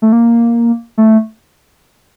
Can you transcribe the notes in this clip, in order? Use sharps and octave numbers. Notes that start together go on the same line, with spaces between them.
A3
A#3
A3